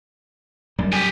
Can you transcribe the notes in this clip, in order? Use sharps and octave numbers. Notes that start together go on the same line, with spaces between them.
F#2 G3
G4 G#5